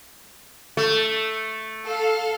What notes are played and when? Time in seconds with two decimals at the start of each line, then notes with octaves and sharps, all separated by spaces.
0.77 A3
1.85 A4 F5